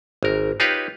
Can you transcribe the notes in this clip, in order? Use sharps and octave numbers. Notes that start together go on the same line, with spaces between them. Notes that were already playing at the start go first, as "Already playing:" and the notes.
G#1 A#4
D#4 F4 G4 B4 C#5 F5